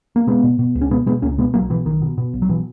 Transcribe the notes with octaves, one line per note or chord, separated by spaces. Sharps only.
A#3
B2 G#3 B3
B2
B2
C#2
C#4
B2 G#3 B3
B2 G#3 B3
C#2 A#3 C#4
B2 G#3 B3
B1 F#3 A#3
B2 E3
B1 D#3
B2
B2
B1
F#3
B2 E3